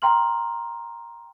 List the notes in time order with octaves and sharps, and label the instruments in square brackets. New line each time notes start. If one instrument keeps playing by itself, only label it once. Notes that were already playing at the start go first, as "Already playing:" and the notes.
[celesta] G5 A#5 C6 F6 F#7